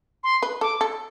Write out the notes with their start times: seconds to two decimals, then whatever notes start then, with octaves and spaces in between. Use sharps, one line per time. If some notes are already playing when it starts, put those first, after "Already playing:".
0.24 C6
0.42 B4
0.61 A4 D6
0.81 A4